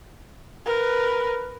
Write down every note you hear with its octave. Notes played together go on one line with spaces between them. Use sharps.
A#4 B4